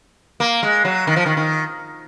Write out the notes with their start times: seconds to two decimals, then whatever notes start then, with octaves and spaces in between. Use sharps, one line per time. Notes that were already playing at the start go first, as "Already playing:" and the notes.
0.40 A#3
0.63 G#3
0.85 F#3
1.07 D#3
1.16 F3
1.26 D#3
1.37 D#3